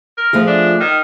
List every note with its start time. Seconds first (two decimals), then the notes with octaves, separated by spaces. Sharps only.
0.17 A#4
0.33 F3 A3 G#4
0.47 D4
0.80 D#3